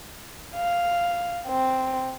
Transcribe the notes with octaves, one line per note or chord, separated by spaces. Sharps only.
F5
C4